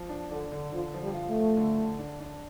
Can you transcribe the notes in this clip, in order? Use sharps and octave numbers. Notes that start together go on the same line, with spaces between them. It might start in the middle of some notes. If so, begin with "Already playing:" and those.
Already playing: F3
D4
D3 D4
D3
D3 F3
F3
G3
F4
A3
F3
D3
D3
D4
D4